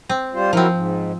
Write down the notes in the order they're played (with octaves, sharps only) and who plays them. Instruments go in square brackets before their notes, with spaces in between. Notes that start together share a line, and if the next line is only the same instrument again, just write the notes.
[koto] C4
[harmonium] G3 F4 C5
[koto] F3 C4 [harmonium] F#3 E4 A#4
[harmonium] G#2